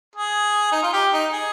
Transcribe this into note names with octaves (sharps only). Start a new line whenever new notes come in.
G#4
D#4
F4
G4
D#4
G#4